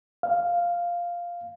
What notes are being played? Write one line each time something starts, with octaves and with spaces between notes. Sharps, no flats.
F5